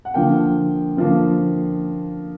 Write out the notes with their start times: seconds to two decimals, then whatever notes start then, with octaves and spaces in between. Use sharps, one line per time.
0.05 F#5
0.14 D3 F3 A#3 G5
0.97 D3 F3 A#3